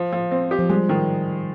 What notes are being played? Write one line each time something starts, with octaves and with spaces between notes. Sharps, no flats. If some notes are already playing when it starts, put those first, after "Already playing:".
Already playing: F3
F3
C4
G4
F3
G3 G#3
D#3